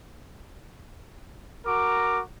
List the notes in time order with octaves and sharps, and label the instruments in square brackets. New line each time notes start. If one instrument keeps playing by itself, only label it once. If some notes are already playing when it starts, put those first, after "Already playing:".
[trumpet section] F#4 A#4 A#5 D6